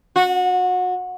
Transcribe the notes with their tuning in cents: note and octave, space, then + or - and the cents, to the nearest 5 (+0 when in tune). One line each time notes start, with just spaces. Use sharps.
F#4 -25